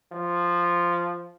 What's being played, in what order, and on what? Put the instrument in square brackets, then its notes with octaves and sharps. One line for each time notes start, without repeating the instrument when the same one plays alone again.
[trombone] F3